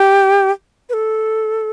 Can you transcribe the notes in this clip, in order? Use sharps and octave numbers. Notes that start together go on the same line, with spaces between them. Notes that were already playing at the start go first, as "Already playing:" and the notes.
Already playing: G4
B4
A4